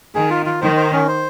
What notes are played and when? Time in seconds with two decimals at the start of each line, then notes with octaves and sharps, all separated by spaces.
0.15 D#3 G#4
0.30 F4
0.46 F4
0.61 D#3 C5
0.76 C5
0.93 C#4
1.08 C5